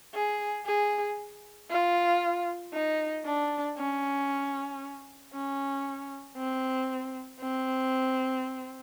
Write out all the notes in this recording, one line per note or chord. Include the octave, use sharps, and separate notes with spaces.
G#4
G#4
F4
D#4
D4
C#4
C#4
C4
C4